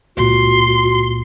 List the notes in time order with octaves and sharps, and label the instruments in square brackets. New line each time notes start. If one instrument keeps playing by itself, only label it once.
[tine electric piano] C#2 A#2 [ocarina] F#4 [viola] C6